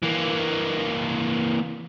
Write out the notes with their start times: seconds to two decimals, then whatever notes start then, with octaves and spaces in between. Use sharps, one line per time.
0.02 E3 A#3